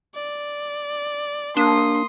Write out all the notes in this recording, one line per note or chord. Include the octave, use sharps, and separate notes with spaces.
D5
A#3 D4 C6 D#6